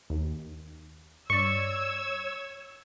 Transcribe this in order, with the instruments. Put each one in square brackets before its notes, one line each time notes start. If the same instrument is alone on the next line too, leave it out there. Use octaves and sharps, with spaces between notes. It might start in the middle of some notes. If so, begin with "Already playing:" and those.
[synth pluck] D#2
[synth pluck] G2 D5 [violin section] C#5 E6 G#6 [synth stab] C#6